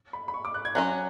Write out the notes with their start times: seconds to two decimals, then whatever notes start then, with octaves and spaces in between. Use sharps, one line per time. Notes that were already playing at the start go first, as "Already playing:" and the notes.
0.13 B5
0.28 B5
0.34 C#6
0.45 D6
0.54 F#6
0.65 G#6
0.75 F#3 C#4 F#4 F#6